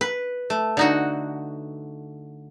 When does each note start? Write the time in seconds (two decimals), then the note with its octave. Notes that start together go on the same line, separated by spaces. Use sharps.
0.01 B4
0.50 A3
0.77 D3 D#4 F#4